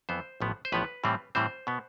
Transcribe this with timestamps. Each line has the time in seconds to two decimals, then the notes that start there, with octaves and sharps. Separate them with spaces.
0.09 F2 E3 B3 C5
0.40 A1 A2 F3 B3
0.65 C5
0.72 A1 A2 F3 B3 B4
1.04 A2 E3 G3 C4
1.35 A2 E3 G3 C4 C5
1.67 B2 B3